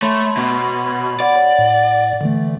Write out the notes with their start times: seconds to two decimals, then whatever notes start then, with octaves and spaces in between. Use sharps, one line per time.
0.02 A3 C#5 B5 C6
0.37 B2
1.20 D5 F#5
1.59 A2
2.21 D3 E3 A3